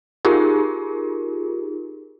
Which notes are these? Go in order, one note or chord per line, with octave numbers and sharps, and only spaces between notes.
D#4 F4 G4 G#4 A#4